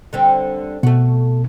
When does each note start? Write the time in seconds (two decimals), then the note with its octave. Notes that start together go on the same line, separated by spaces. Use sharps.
0.13 D3 G3 C4
0.83 B2 A3 F#4